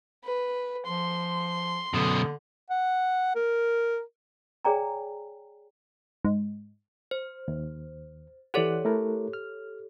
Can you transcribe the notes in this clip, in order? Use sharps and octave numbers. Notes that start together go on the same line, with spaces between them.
B4
F3 C6
F#2 B2 D3
F#5
A#4
G#4 C#5 D5 G5 G#5 A#5
G#2
C5
D#2
E3 G4 A4 C#5 D5 F#5
A3 E4 A#4
F6